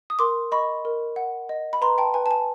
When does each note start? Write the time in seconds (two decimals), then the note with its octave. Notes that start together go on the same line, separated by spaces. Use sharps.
0.10 D#6
0.19 A#4 C6 D6
0.52 D#5 B5 C#6
0.85 A#4
1.16 F#5
1.49 D#5
1.73 B5
1.81 B4 A#5 C6
1.98 G5 A5
2.14 B4 G#5
2.26 A5
2.31 G#5